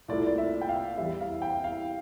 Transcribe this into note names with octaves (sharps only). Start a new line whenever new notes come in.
C2 A#2 A3 D5
D5
E5
G5
F5
E2 E3 G3 E5
F5
G5
F5